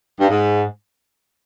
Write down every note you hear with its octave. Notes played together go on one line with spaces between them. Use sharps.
G2
G#2